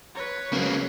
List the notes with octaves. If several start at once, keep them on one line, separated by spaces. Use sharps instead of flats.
B4 C#5
C#3 F#3 A#3 C4